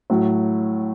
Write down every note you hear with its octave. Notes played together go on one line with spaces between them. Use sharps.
A2 F#3